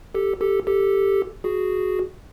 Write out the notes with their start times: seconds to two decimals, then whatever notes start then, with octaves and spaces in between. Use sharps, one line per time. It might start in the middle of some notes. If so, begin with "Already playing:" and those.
0.15 G4 A4
0.41 G4 A4
0.67 G4 A4
1.44 F#4 G#4